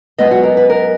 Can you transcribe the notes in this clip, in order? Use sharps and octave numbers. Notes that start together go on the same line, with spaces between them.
F#2 D#3 G#3 B3 D#5
F#4
A#4
B4
A#4